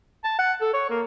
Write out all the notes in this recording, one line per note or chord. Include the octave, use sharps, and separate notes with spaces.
A5
F#5
A4
C#5
A#3